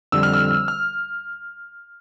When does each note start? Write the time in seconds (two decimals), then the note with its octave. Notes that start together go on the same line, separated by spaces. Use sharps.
0.12 F2 D3 G3 E6
0.23 F6
0.34 E6
0.68 F6